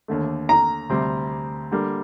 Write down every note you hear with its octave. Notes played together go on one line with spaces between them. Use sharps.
D#2 D3 A3
A#5
D2 C3 G3 C4
D3 G3 A#3